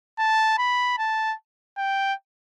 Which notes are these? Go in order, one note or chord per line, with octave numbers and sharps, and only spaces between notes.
A5
B5
A5
G5